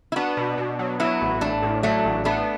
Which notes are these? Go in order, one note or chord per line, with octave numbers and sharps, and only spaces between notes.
E4
B3 D4 F#4
B2
B2
F#3
F#3 B3 E4
A1
A1 A3 D4
A2
F#3 A3 D4
A1
A3 B3 D4